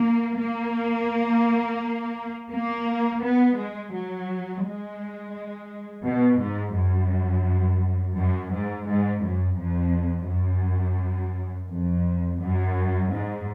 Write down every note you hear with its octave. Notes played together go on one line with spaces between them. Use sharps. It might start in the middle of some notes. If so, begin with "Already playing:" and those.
Already playing: A#3
A#3
A#3
B3
G#3
F#3
G#3
B2
G#2
F#2
F#2
G#2
G#2
F#2
F2
F#2
F2
F#2
G#2